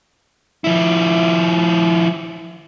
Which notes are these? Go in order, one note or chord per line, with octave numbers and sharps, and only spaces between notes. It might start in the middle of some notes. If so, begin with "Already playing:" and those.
F3 E4